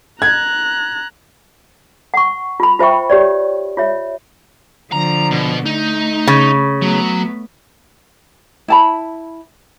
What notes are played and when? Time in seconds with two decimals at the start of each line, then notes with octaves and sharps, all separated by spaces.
0.22 A#5 F#6 G#6
2.14 F#5 C#6
2.60 F4 B5
2.79 F4 C5 E5 G5 C#6
3.10 G4 C#5 D5
3.77 F4 C#5 E5
4.92 D3 F3 A#5
5.31 B2
5.66 A3 D#4
6.27 C#3
6.82 F#3 A3 B3
8.68 E4 A5 B5